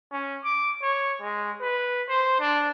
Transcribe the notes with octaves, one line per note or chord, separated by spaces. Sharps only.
C#4
D6
C#5
G#3
B4
C5
D4